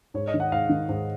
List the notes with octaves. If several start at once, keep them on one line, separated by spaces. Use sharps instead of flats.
G#2 C#5
D#5
D#3
F#5
G#2 F5
D#3
G#2